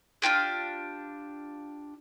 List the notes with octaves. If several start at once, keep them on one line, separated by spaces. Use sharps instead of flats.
D4 F4 G4 G#4